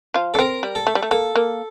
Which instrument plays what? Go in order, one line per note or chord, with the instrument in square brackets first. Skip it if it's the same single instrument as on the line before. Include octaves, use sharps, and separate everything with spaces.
[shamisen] F3 F4
[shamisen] D4 [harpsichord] A4
[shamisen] C4 [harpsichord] A#4
[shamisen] G3
[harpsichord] A4
[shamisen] A3
G3
A3
[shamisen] A#3 [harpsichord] A4
[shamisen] A#3